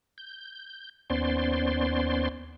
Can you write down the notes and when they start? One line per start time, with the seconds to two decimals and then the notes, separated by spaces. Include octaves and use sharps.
0.18 G6
1.10 D#2 B3 C#4 C5 D5 C6